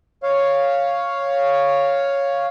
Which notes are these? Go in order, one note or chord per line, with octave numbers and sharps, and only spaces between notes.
C#5 F5